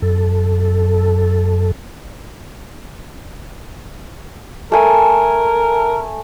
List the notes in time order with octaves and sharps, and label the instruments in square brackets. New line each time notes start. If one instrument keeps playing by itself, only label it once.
[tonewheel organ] F#2 A4
[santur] A3 G#5 [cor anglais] A#4